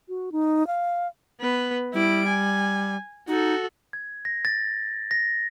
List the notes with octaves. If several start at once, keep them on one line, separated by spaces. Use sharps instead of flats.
F#4
D#4
F5
B3 B4
G3 E4 D7
G#5
D#4 F#4 A4
G#6
A#6
A6
A#6